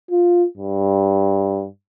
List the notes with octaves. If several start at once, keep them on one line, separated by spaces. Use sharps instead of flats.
F4
G2